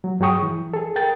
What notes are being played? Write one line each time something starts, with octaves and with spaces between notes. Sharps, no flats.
F#3
G2 F#3 G#4 G5 C#6 D#6
E3
G#4 A4
A#4 G5 A6